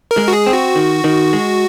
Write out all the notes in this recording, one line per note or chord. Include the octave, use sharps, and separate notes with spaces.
A#4
G#3
F#4
G#4
C4
F#4
D#3
D#3
G#3